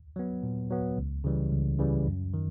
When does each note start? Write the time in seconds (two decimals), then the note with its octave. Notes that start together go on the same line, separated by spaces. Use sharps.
0.16 F#3 B3
0.43 A#2
0.71 F#3 B3
0.98 C#2
1.24 C#3 E3 G3
1.52 C#2
1.79 C#3 E3 G3
2.07 F#2
2.34 D#3